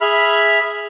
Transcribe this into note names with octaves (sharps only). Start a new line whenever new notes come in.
G#4 E5 B5 F6